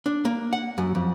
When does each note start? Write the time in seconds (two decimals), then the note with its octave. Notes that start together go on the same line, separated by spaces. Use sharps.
0.06 D4
0.25 A#3
0.53 F#5
0.78 F#2
0.95 F2